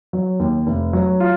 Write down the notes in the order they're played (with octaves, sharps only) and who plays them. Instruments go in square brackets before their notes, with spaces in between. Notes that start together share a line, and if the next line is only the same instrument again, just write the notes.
[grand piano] F#3
D#2
F1
F#3
F4